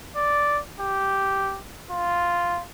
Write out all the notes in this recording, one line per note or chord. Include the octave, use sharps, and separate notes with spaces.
D5
G4
F4